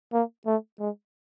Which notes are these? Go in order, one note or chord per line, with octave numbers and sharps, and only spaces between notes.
A#3
A3
G#3